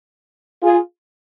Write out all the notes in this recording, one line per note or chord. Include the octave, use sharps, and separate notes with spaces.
F4 G#4